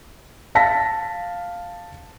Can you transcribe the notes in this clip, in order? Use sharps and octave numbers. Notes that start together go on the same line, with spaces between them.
F5 A5 A#6 B6